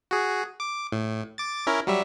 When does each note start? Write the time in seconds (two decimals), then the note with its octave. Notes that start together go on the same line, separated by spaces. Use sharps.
0.11 F#4 G#4
0.60 D6
0.92 A2
1.38 D6 A6
1.67 C#4 E4 A#4
1.87 F#3 G3 E5